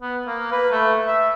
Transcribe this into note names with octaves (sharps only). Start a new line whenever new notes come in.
B3
A#3
B4
A3
E5